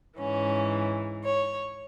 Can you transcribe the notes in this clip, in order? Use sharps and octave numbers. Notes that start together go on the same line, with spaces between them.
G#2 E3 C#4
C#5